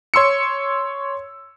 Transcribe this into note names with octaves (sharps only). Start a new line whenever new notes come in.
C#5 C6 E6 C#7